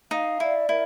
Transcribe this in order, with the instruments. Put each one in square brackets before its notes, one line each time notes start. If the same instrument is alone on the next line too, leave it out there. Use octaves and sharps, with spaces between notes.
[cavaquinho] D#4 [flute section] F5
[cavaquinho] E4 [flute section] D5
[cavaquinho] E4 [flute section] A#4